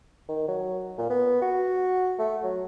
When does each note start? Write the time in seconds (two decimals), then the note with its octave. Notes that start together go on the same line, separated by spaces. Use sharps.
0.29 D#3
0.48 F#3
0.98 A#2
1.10 B3
1.42 F#4
2.19 A3
2.44 F#3